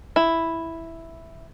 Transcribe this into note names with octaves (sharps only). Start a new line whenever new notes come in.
E4